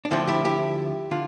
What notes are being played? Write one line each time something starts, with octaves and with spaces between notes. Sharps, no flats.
D4
D2 D3 F3 C4 E4
E4 G4
E4 G4
D3 F4